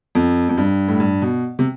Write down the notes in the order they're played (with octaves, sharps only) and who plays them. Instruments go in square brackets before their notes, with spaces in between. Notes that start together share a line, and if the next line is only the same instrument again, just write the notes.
[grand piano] F2
F2
G2
A2
G2
B2
C3